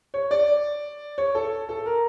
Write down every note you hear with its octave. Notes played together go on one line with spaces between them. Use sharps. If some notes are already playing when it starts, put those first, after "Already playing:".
C#5
D5
C#5
A4
A4
A#4